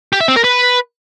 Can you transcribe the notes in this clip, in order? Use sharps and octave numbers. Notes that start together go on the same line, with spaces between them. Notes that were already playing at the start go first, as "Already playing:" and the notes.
G4
E5
C4
A#4
B4